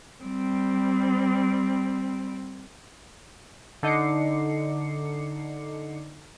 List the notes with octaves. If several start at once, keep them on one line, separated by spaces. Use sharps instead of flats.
G3 C4
D3 D#4 D#5 D6 C7 C#7